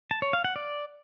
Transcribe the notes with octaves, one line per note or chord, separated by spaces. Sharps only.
A5
C#5
F5
F#5
D5